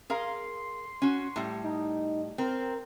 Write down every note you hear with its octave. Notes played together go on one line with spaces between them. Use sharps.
G#4 A#4 F5 C6
C#4 F#4
A2 G3
D#4
C4 A#4